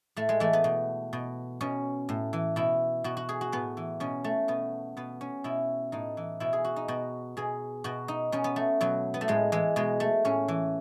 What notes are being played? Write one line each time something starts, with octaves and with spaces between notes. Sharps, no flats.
A2 A3
G#3
E3 A3
B3
B2
B2
B2 C#4
A2
E3
B2 E4
B2 F#4
F#4
G#4
F#4
A2 B3
E3
B2 C#4
A3
B2 B3
B2 B3
C#4
B2 E4
A2 D#4
E3
B2 E4
G#4
F#4
D#4
B2 F#4
B2 G#4
B2 F#4
D#4
B2 C#4
B3
A3
B2 F#3
B3
A3
A2 G#3
E3 G#3
B2 G#3
A3
A2 C#4
E3